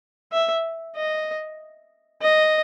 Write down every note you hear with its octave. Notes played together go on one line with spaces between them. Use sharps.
E5
D#5
D#5